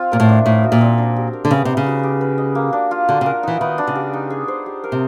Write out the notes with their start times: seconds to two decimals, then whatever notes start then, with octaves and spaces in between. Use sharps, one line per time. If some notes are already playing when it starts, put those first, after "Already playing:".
Already playing: C4 F4
0.12 A#2 A#4
0.20 A2
0.29 D4
0.46 A2 D#4
0.63 F#4
0.72 A#2
0.81 C4
0.98 D4
1.16 G4
1.33 A#4
1.45 D3
1.51 C#3 B3
1.65 C3 D#4
1.77 C#3
1.86 F#4
2.03 G4
2.21 B4
2.38 D#5
2.55 A#3
2.73 D4
2.91 F4
3.08 D3 F#4
3.21 C#3
3.26 A#4
3.43 E3 D#4
3.61 D#3 B3
3.78 D4
3.87 C#3
3.95 G4
4.13 D#4
4.30 G#4
4.48 C5
4.66 G4
4.84 A#4
4.92 C3